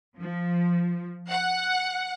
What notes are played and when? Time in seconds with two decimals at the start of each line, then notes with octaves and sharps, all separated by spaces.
0.18 F3
1.30 F#5